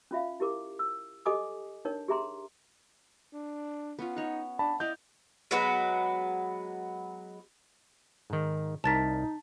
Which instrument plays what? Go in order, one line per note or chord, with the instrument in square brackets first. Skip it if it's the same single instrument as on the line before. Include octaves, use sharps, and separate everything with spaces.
[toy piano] C#4 F4 E5 F5
E4 G4 A#4 D6
E6
G4 A4 D#5 G#5 D6 D#6
D4 D#4 A#4 C#5
G4 G#4 E5 A#5 C6
[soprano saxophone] D4
[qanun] B3 C#4 F4
[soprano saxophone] D#4 [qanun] C#5 F#5
[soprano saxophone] D4 [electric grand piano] A5 B5
[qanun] E4 D5 F5 [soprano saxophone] D#5 [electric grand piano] G6
[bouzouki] F#3 G#3 B3 F#4
[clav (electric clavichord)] G#2 D#3
[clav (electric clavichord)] C2 A#4 [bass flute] D#4 [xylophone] A5 A6 B6